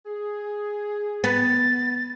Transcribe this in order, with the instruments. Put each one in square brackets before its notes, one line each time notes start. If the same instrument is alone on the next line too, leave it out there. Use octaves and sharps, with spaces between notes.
[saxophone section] G#4
[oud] B3 [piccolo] A6